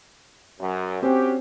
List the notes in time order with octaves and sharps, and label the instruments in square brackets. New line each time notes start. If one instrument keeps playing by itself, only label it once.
[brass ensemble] F#2
[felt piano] C4 [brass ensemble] C#4 F#4 G4